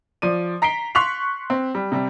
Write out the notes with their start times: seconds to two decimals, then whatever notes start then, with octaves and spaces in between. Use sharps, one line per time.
0.22 F3 D5 D#7
0.62 A#5 B6 C7 D7 G7
0.95 C6 C#6 F#6 B6 F7
1.50 C4
1.75 G3
1.92 C3 G3